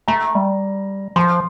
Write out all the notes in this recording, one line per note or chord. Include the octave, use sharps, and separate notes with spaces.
A3 A#5
G3
F3 C6